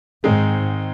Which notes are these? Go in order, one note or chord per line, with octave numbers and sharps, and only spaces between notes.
G#2 D#3 G#3 C4 D#4 G#4